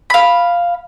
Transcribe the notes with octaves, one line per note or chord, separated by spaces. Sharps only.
F5 B5